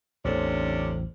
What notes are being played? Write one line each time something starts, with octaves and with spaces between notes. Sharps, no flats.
A1 E2 C3 C#4 D4 A4 C5 C#5